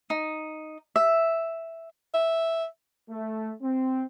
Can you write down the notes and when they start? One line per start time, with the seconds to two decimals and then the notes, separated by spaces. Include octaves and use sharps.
0.10 D#4
0.96 E5
2.14 E5
3.10 A3
3.62 C4